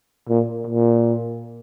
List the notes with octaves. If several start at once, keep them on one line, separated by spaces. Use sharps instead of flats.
A#2
A#2